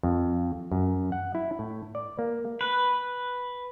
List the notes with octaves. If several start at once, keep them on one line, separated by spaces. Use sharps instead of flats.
F2
F#2
F#5
E4
A2
D5
A#3
B4